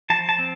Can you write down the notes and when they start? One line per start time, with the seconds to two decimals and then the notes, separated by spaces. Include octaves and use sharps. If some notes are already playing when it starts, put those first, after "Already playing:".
0.10 F3 A5
0.29 A5
0.39 C4